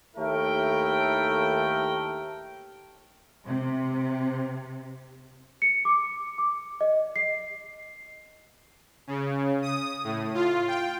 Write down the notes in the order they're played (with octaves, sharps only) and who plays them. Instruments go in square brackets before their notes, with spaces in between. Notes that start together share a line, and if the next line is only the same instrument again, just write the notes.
[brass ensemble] D#2 A3 E4 A4 A#4 G5
[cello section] C3
[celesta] C#7
D6
D6
D#5
C7
[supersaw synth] C#3
D#6
A2
F4
G5